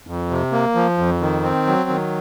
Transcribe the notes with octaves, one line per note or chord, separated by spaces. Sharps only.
F2
C3
A#3
F3
F2
D#3
C4
F#3
D#3